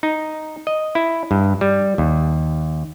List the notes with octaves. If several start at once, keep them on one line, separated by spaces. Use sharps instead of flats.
D#4
D#5
E4
G2
G3
D#2